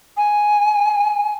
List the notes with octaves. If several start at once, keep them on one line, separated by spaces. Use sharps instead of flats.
G#5